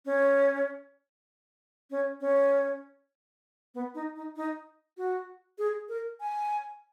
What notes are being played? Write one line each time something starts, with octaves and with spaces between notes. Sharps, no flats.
C#4
C#4
C#4
B3
D#4
D#4
D#4
F#4
G#4
A#4
G#5